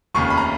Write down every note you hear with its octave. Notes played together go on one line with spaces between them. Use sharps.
F1 D#2 C#3 C#6
B5
A#5